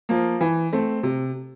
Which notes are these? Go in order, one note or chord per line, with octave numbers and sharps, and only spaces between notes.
F3 A#3
E3
A3 C4
C3